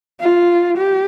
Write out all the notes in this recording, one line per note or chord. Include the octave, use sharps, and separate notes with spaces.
F4
G4